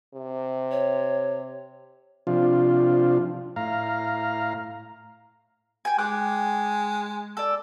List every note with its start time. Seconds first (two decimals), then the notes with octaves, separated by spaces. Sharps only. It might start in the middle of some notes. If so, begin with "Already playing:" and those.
0.14 C3
0.71 C#5
2.27 C3 F3 D4 F4
3.56 A2 F5 A#5
5.85 G5 G#5
5.98 G#3 G5 D6 F#6
7.37 A4 D5